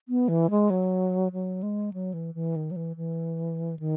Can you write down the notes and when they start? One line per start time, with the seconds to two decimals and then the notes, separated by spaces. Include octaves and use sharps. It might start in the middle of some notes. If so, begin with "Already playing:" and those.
0.09 B3
0.28 E3
0.50 G#3
0.70 F#3
1.32 F#3
1.63 G#3
1.93 F#3
2.13 E3
2.35 E3
2.56 D#3
2.71 F#3
2.76 E3
2.97 E3
3.79 D#3